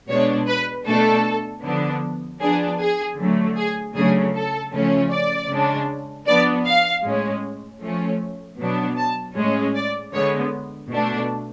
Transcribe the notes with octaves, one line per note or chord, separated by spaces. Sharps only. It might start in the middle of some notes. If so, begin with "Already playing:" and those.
B2 G#3 D4 C#5
B4
B2 A3 D4 A4
D3 F3 B3 D4
F3 B3 D4 G#4
G#4
D3 F#3 A3
G#4
C#3 F#3 A3 D4 G#4
A4
C#3 F3 A3 C#4
D5
C#3 G#3 D4
F3 B3 D4 D5
F5
A2 G#3 C#4
F3 A3 C#4
B2 F#3 B3 D4
A5
A2 G#3 C#4
D5
D3 G#3 B3 C#5
B2 A3 D4